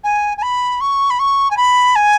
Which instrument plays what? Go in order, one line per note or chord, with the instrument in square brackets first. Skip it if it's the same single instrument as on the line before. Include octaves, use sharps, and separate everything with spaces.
[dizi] G#5
G#5
B5
C#6
B5
C#6
G#5
B5
G#5